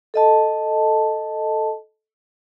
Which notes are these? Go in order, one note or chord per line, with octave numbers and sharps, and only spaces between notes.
A4 D#5 A5